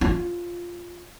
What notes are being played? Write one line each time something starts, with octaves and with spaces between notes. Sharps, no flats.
F4